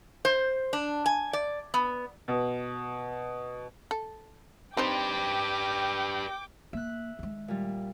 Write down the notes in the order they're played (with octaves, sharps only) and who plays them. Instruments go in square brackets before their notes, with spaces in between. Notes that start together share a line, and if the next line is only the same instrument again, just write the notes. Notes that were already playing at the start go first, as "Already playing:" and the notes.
[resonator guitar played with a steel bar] C5
D4
G#5
D5
B3
[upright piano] B2
[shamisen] A4
[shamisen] C4 D#4 C5 [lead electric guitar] G4 B4 [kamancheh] G5 D6
[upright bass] A#3 [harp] E5 F#6
[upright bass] D#3 G#3
[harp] A#2 G3